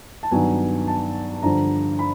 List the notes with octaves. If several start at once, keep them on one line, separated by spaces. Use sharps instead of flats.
A5
G2 D#3 F#3 B3 G#5
A5
G2 D3 F3 A#5
B5